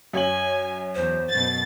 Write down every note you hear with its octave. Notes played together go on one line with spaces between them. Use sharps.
F#2 C#5 G#5 F#7
E2 C5
F#2 B2 A6